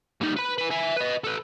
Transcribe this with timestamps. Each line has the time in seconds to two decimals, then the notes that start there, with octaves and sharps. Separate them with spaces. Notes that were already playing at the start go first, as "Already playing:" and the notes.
0.21 G3 D#4
0.36 B4 B5
0.58 E4 B4
0.71 E5 G#5
0.96 B4 D#5
1.24 A4 B4